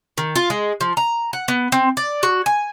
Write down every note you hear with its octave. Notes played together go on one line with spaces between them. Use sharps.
D#3
F4
G#3
F3
A#5
F#5
B3
C4
D5
F#4
G#5